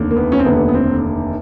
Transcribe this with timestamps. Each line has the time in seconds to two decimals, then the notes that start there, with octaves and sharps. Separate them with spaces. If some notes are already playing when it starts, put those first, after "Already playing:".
Already playing: F1 D#2 D3
0.11 A#3
0.16 B3
0.32 C#4
0.39 C4
0.45 F1 D#2 D3 B3
0.69 B3
0.74 C4